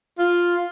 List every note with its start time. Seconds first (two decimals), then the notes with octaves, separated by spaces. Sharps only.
0.19 F4